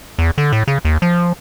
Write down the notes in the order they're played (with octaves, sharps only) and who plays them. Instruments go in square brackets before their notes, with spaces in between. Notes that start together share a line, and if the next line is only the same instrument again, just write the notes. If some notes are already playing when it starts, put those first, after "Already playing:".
[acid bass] E2
D3
A2
C#3
D#2
F3